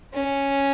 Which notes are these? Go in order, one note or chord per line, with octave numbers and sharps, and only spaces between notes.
C#4